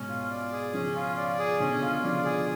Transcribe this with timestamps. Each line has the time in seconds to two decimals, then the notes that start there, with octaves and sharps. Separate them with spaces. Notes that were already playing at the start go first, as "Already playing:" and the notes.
Already playing: G#2 B2 C#4
0.08 F4
0.31 D5
0.52 G#4
0.73 C#3 F3 C#4
0.95 F4
1.17 D5
1.39 G#4
1.60 B2 D3 C#4
1.81 F4
2.03 C#3 F3 D5
2.25 G#4